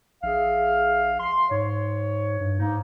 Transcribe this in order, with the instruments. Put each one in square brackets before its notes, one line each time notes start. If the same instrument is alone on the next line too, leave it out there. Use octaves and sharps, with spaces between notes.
[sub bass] A#1 [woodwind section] G#4 E5 F5
[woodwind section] C6
[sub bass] G#2 [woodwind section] C#5
[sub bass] G2
[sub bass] G#2 [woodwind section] A#3 D#4